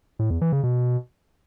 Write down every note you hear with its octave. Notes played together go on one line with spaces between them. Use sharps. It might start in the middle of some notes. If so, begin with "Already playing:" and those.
A2
E2
E3
C#3
B2